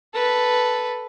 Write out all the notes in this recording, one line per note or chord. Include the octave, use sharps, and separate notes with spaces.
A4 B4